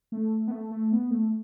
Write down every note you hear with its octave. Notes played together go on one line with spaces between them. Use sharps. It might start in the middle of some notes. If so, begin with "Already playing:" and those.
A3
B3
A3
A3
B3
A3